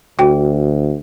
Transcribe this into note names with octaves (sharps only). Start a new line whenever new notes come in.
D2 F#4 G5